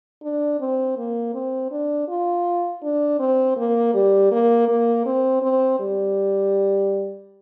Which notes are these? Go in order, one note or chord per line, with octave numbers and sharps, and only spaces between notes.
D4
C4
A#3
C4
D4
F4
D4
C4
A#3
G3
A#3
A#3
C4
C4
G3